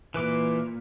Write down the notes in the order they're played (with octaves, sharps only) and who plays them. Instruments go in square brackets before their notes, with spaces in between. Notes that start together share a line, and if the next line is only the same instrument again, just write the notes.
[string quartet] A#2 [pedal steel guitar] E3 B4 D6